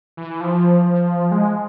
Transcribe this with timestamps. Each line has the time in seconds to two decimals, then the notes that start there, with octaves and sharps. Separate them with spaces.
0.17 E3
0.40 F3
0.86 F3
1.31 G#3